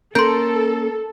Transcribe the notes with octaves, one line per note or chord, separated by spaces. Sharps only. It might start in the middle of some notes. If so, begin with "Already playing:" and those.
A#3 C#4 A4 A#4 C6 G6